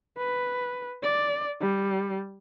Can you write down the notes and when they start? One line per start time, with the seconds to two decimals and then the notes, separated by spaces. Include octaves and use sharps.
0.18 B4
1.03 D5
1.61 G3